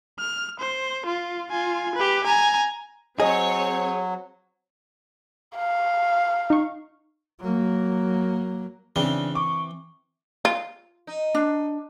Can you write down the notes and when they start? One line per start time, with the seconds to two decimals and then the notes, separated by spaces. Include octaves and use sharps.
0.19 F6
0.60 C5
1.06 F4
1.51 F4 G#5
1.96 G4 B4
2.24 G#5 A#5
3.20 F#3 C4 G#4 C#5 D#5
5.56 F5
6.50 D#4 C#6
7.40 F#3 A#3
8.96 C#3 E3 C4 D4
9.35 C#6 D6
10.45 F4
11.07 D#4
11.35 D4